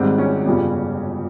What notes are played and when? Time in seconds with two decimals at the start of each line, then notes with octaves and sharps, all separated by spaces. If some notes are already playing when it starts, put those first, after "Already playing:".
Already playing: G#1 G#2 G3 C4
0.18 C#4
0.46 G1 F2 C#3 G3